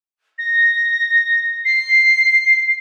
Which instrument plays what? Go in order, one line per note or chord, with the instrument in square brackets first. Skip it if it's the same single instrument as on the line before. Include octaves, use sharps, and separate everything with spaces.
[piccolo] A#6
C7